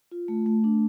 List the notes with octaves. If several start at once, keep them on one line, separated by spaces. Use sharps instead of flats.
F4
A3
A3
D4